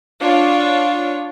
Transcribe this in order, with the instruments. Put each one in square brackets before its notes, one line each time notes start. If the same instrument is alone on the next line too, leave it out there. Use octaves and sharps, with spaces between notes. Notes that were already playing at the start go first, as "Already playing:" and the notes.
[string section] D4 F4 C#5